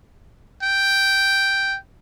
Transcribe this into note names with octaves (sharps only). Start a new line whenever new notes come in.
G5